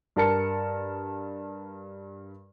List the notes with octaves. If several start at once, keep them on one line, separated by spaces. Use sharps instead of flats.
G2 A#4 A5 C#7